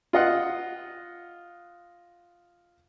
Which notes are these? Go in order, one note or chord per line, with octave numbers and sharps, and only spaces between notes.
F4 D#5 F#5